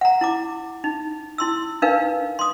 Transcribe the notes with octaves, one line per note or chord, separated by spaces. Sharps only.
F#5 A#5
E4 A#5 D6
D#4
E4 C6 E6
D4 D#4 A#4 B4 F5
C6 D#6